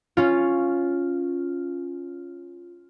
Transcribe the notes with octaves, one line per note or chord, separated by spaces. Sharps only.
C#4 F4